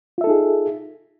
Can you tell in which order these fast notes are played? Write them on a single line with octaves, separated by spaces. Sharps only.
F4 E5 A4 D#4 G#4